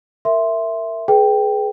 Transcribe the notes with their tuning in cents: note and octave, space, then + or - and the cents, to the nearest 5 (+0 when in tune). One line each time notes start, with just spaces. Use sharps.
A#4 -15 E5 +0 C6 +0
G#4 +25 B4 -5 G5 +0